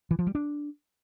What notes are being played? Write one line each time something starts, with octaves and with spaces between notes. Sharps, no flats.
E3
F3
G3
D4